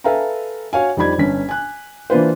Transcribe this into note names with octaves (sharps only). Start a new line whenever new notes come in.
A4 B4 E5 F5 G#5 A#5
F#4 C#5 F5 G#5
F2 G3 D#4 D5 B5 G#6
G1 C#4 B6
G#5 F#6
E3 A#3 D4 F4 B4 C5